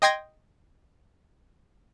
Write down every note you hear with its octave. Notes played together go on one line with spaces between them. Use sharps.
D#5 G5 C6 G#6 A#6